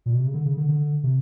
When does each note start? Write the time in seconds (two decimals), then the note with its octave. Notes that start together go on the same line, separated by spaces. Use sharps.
0.06 A#2
0.13 B2
0.20 C3
0.27 C#3
0.34 D3
0.45 C#3
0.57 D3
0.68 D3
1.03 C3